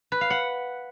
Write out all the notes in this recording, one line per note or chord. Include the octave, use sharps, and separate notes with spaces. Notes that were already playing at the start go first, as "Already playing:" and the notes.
B4
F5
F#5